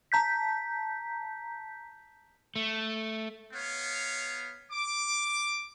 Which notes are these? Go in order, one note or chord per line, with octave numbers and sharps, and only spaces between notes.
A5 A#5 G6 B6
A3
B3 C#5 F5
D6